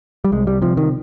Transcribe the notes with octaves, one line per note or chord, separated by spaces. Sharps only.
G3
C2 G#3
G3
C3 F3
D#3